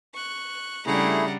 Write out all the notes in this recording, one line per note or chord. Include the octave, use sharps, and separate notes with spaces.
C#6 F#6
C#3 G3 A3 D4 E4 G#4 F#5 A#5